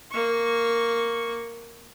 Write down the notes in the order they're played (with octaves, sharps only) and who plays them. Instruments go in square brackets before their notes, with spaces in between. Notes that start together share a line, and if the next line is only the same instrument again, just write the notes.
[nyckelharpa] A#3 C#6